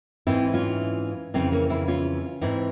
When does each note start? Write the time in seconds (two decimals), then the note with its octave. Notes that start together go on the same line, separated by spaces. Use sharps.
0.27 G#2 E3 C4 E4
0.54 C#4 F4
1.34 F2 C#3 E3 C4 E4
1.52 A#3 C#4
1.69 C4 E4
1.88 C#4 F4
2.41 G#2 E3 C4 E4